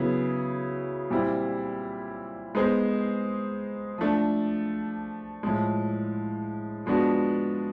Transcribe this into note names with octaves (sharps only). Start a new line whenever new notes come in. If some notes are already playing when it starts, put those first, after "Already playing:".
Already playing: C#3 F#3 B3 E4 G#4
A#2 G3 C4 E4
G#3 B3 D#4 G#4 C5
F3 A3 D4
A2 F3 G#3
F3 G#3 B3 D4 F#4